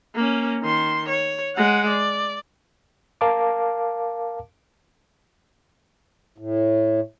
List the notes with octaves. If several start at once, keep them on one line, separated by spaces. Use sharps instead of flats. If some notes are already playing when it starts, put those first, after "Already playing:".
A#3 C#4
D#3 C6
C#5
G#3 F#5
D5
A#4 F5 A5 D6
A2